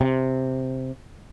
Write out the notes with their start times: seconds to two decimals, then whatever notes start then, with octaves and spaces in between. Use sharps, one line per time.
0.01 C3